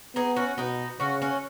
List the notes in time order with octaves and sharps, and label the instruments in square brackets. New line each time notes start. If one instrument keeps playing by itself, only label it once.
[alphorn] B3 [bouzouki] D#4 G#4
[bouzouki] C#4 F#4
[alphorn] B2 [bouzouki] B3 D#4
[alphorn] C#3 [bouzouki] C#4 F#4
[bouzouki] C#4 F#4